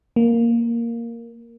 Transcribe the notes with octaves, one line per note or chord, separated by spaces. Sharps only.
A#3